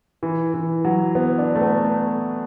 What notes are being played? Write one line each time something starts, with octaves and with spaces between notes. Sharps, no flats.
E3
E3
F#3
B3
D4
A3
B3
A3